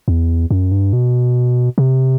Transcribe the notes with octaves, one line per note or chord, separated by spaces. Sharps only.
E2
F#2
G2
B2
C3